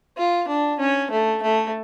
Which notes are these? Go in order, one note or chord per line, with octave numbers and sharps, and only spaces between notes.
F4
D4
C#4
A3
A3